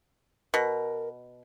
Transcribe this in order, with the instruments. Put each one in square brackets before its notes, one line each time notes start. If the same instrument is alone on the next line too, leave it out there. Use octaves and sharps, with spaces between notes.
[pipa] B2 [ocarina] A#4